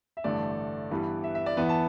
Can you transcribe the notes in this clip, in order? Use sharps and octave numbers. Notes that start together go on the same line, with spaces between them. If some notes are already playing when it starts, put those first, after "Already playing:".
E5
A1 G2 D3 A3 D5
G2 E3 G3 B3
E5
E5
D5
E2 E3 B3 E5
A5